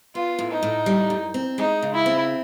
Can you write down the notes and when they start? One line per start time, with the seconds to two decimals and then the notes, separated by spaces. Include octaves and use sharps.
0.15 B3 F4
0.39 A2
0.51 D#4
0.63 A2
0.86 G3
1.10 F#2
1.34 C4
1.58 G#3 D#4
1.82 C#3
1.94 E4
2.06 C4